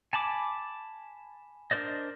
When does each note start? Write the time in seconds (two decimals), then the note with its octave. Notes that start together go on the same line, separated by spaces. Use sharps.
0.13 G#5 A5 B5 D6
1.71 D4 A#4 C5 D5 D#5